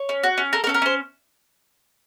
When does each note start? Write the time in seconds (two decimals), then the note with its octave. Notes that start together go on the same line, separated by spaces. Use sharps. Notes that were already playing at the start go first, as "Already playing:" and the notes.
Already playing: C#5
0.09 C#4
0.23 F#4
0.38 C#4
0.53 A4 A#4
0.64 A#4
0.67 C#4 A4
0.74 A#4
0.82 C#4 C5